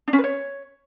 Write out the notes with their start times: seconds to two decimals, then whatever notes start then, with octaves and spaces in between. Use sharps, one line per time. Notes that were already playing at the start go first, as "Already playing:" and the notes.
0.08 D4
0.13 C#4
0.18 B4
0.24 C#5